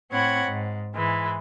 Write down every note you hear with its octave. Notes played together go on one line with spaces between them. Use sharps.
A2 C4 C#5 F#5 B5 G#6
G#2
G#2 E3 G#3